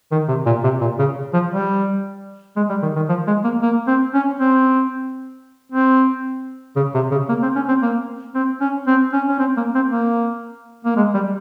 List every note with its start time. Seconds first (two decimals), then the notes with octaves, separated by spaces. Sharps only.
0.12 D#3
0.28 C3
0.46 A#2
0.64 C3
0.81 A#2
0.99 C#3
1.34 F3
1.51 G3
2.56 G#3
2.69 G3
2.82 D#3
2.96 D#3
3.09 F3
3.27 G#3
3.44 A#3
3.62 A#3
3.87 C4
4.14 C#4
4.40 C4
5.72 C4
6.76 C#3
6.95 C3
7.11 C#3
7.29 A#3
7.43 C4
7.56 C#4
7.68 C4
7.82 A#3
8.35 C4
8.61 C#4
8.87 C4
9.13 C#4
9.28 C#4
9.39 C4
9.57 A#3
9.75 C4
9.92 A#3
10.85 A#3
10.97 G#3
11.14 G3